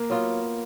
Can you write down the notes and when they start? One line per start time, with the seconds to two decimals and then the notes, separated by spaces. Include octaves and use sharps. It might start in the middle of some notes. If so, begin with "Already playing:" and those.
Already playing: A#3
0.10 F#3 B3 F4